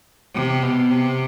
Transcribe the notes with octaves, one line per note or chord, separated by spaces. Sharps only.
C3
B2
C3